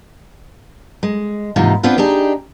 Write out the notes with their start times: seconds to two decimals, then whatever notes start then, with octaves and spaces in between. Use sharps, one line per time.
1.03 G#3
1.56 D#2 G#2 C3 E3 D#4 F4
1.83 B3 C4 D4 F4 B4
1.97 D4 D#4 G4 G#4